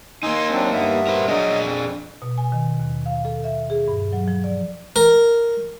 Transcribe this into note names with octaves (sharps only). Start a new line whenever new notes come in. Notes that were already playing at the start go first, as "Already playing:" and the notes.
A#3 D#4 G#5 C6 E6
F#3 C4 D4
G2 B3 E5
A#4 C5
F#3 D4 G#4 D#5
F2
B2
G#5
D#3
D#2
F5
A4
E5
G#4
G2
F#3
F3
D5
A#4